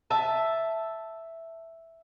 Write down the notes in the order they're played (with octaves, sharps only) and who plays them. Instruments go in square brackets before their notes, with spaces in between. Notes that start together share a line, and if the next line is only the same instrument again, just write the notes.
[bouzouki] E5 A5